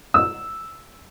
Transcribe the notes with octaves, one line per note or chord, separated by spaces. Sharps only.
E6